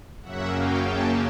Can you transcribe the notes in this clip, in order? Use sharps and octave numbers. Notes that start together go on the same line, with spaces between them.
F#2 C#3 F#3 A#3 C#4 E5 F#5
F5 G5
G5 A5